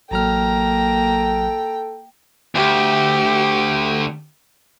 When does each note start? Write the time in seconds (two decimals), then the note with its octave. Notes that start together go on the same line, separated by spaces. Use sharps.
0.11 A1 F#3 A#3 A4 G5 A#5 F6
2.55 D2 G4